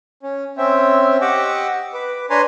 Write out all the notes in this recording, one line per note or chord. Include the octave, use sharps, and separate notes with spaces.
C#4
C4 C#4 E5 G5
G4 D#5 F#5 C#6 D6 E6
B4 D6
D4 B4 C#5 G#5 A#5 C6